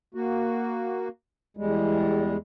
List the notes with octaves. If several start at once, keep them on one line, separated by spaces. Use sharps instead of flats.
A#3 F#4
E2 G3 G#3